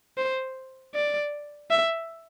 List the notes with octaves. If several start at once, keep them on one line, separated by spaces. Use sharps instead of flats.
C5
D5
E5